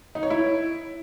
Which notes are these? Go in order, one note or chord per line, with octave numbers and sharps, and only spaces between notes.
D#4
C#5
E4